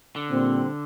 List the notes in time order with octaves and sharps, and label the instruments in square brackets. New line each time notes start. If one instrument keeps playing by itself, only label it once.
[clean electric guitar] D3
[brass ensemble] A#2 G3 C4